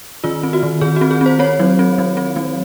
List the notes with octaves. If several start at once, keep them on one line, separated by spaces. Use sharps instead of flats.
D#3 F4
C4
F#4
D#3
D#3 G#4
F#4
C4
G#4
C4 C5
C4 C#5
F#3
C4
F#3
C4
F#3